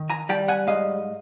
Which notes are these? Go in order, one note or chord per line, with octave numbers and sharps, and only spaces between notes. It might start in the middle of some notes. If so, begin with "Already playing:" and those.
Already playing: D#3
G#5 A#5
G3 G5 A5
F#5 G#5
G#2 D#5 F5